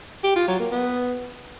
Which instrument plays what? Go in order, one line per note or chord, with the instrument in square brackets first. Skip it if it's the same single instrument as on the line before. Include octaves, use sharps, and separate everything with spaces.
[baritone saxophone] G4
F4
F#3
A#3
B3